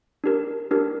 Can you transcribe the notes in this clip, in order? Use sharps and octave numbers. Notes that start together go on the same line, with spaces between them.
D4 G4 A#4
D4 G4 A#4